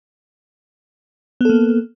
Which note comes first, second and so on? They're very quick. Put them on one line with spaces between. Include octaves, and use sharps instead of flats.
B3 A4 A#3